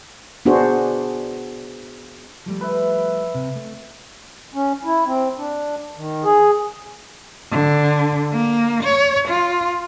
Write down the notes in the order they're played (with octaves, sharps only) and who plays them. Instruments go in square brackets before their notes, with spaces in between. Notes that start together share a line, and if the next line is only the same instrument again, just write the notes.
[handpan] B3 D4 F#4 G#4 C5
[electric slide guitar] F3 G3 A3
[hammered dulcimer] B4 E5
[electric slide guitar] C3
A3
[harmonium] C#4
E4
C4
D4
D#3
G#4
[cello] D3
A#3
C#5
F4